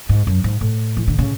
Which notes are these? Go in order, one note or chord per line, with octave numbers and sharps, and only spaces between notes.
G#2
F#2
G#2
A2
E3
D3
C#3